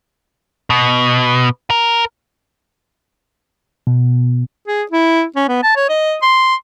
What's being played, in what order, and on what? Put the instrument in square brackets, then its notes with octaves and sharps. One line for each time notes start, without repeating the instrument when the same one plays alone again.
[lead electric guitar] B2
A#4
[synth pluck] B2
[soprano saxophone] G#4
E4
C#4
B3
A5
C#5
D#5
C6